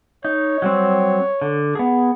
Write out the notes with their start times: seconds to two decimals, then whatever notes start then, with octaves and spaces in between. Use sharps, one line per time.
0.25 D#4 C#5
0.62 F#3 G3 C4
1.41 D3
1.75 B3 G#4